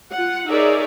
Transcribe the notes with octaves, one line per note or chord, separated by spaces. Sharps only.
F4 F#5
D#4 G#4 A#4 C#5 D5 E5